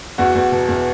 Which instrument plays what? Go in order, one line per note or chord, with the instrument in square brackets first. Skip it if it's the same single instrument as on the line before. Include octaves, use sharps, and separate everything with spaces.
[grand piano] E2 F#4
E2
B2
E2